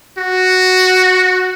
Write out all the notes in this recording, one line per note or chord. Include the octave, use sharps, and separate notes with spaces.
F#4